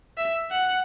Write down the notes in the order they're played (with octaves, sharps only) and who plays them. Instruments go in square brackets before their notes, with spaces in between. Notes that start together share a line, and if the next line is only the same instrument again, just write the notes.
[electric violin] E5
F#5